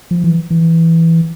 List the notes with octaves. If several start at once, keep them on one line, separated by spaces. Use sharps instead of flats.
F3
E3
E3